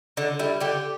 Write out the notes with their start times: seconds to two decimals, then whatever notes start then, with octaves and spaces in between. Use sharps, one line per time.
0.17 D3
0.39 G3 E4
0.61 D3 G4